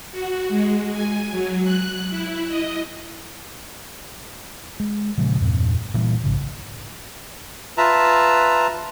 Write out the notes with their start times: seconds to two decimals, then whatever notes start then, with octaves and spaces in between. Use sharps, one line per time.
0.12 F#4
0.48 G#3
0.92 G#5
1.31 F#3
1.63 F#6
2.09 E4
2.48 D#5
4.80 G#3
5.18 A#2 C#3 F3 G#3
5.41 E2 G2 A#2 C4
5.94 A#2 E3 G3
6.24 A#1 G#2 C#3
7.78 F4 B4 E5 A5 A#5